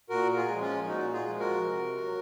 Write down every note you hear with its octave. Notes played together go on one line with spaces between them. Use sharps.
A#2 F#4 A#4
F4 G#4
F3 G#3
C#4 F4
A#2 D#4 F#4
F4 G#4
F3 G#3
F#4 A#4
C3
F#3